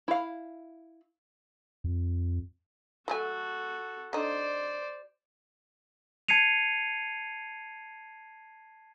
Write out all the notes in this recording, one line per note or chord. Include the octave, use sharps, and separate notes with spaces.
E4 F5
F2
F#3 A3 F#4 A4 G#5
D3 D#4 C5 D5
A5 G#6 C7 C#7 D#7 F7